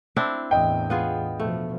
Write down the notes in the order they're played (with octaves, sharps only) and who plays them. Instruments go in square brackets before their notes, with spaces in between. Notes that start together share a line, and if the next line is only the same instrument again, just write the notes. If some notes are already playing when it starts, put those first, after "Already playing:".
[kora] C4 D4 E4
[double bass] E2 A2 [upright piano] D#5 G5
[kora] B3 F4 G#4
[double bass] B2 F3 [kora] A3